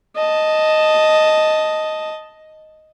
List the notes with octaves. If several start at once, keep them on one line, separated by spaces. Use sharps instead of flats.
D#5 A5